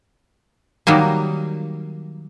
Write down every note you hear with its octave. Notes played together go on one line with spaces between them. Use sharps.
D#3 F#3 G3 A#3